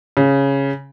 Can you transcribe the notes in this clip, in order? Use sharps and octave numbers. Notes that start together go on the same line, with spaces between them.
C#3